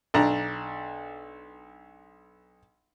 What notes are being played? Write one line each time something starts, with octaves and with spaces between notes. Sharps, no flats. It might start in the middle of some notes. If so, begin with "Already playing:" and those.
B1 D4 A#5